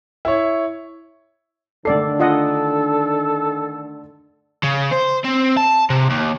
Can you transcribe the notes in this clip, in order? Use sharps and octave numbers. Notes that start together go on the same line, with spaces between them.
E4 C#5
D3 D#3 A3 D4 A4 D5 C7
F4 A4 D#5 F#5
C#3
C5
C4
A5
C3
D#2